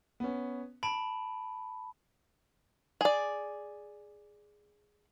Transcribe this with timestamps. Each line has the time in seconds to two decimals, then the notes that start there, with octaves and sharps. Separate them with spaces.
0.20 B3 C#4
0.83 A5 B5 D7
3.01 G#4 D5